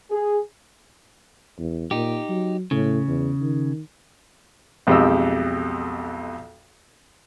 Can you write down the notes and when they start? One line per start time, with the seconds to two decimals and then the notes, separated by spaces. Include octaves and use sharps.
0.11 G#4
1.58 E2
1.91 A#2 D#4 G4
2.29 F#3
2.71 A2 C#3
3.07 E2
3.41 D#3
4.87 B1 F2 G#3 G4 D#5 E6